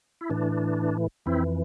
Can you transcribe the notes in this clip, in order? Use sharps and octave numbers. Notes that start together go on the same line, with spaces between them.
E4
A2 E3 D4
F2 E3 C4 E4